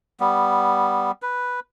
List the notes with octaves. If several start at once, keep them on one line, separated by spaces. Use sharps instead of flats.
G3 B3
B4